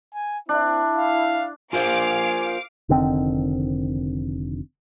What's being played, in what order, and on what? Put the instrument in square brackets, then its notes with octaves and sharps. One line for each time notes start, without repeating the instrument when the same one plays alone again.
[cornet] G#5
[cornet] C4 [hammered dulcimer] D4 [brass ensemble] E4
[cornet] F5
[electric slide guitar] F4 A#4 C5 [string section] F5 D6 [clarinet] G#5
[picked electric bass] F1 D3 D#3 C4